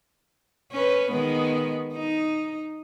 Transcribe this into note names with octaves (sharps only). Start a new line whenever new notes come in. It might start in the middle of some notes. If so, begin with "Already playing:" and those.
C#4 B4
D#3 G#3 B3
D#4